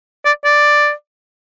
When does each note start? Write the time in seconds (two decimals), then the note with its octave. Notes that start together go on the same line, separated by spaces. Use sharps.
0.26 D5
0.45 D5